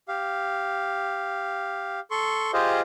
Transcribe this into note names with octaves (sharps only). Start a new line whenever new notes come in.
G4 F5
A4 C6 C#6
F4 G4 G#4 C5 D#5 F5